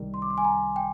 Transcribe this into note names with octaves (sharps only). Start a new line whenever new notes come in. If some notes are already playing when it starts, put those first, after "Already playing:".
Already playing: C2 C3 D#3 G3
C6
D6
C6
G#5
A#5
G5